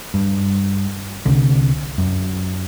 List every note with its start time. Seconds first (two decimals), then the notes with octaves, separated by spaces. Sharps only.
0.14 G2
1.26 C2 D3
1.98 F#2